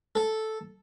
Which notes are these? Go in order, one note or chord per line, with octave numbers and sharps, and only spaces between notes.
A4